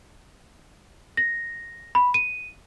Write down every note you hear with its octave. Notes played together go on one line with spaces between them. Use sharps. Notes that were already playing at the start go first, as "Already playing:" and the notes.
A#6
B5
D#7